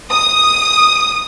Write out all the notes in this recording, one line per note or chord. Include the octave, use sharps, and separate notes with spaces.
D#6